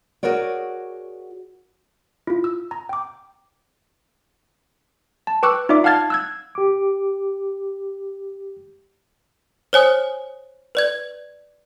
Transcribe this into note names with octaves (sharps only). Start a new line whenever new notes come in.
F#4 G#4 A#4 C#5 D5
E4 F4
E6
A#5
G5 D6
A5
B4 G5 C#6 D6 E6 F#6
D#4 F4 D5 E5 D6
F5 F#5 A5 F6 G#6 A6
E6 F#6 G#6
G4 D6
C5 C#5 G#5 D#6 F#6
B4 D5 G#6